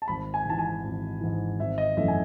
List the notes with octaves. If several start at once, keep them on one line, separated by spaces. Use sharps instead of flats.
A5
G#1 B5
G#5
G#2 E3 A5
G#5
G#1
G#2 E3
G#1 E5
D#5
F#2 E3 A3 E5
G#5